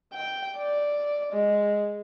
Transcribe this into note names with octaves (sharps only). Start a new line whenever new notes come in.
G5
D5
G#3